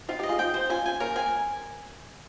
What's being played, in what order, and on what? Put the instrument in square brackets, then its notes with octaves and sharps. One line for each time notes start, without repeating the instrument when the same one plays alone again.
[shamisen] C4 D#4 [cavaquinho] F4
[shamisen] D#4 G4 [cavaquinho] D#5
[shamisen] F4 G#4
[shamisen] C4 D#4 [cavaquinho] G5
[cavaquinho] C5
[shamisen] C#4 F4 [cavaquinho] G#5
[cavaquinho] G#5
[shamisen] A#3 C#4 [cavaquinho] A#4
[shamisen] C4 [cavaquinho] G#5